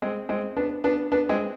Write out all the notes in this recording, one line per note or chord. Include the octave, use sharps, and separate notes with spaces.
G#3 C4
G#3 C4
B3 D4
B3 D4
B3 D4
G#3 C4